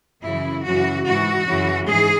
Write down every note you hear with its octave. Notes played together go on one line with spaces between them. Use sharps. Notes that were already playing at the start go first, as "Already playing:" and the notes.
F#2 C#3 E3 E4
F#2 C#3 E3 F#4
G#2 E3 F#4
F#2 C#3 E3
G#2 E3 G#4